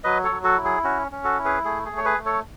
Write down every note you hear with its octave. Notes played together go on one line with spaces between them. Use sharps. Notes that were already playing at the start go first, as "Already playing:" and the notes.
F#3 B4 D#5
A4 C#5
F#3
F#4 A4
E4
G#4
C#4 F#4
C#4
F#4 A4
E4
G#4 B4
A3 G#4
G#4
A3
C#5
G#4 B4
A3
A4 C#5